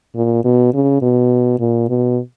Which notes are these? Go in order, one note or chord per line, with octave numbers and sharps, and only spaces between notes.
A#2
B2
C#3
B2
A#2
B2